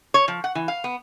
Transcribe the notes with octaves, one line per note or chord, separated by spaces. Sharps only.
C#5
F3
F#5
E3
F5
B3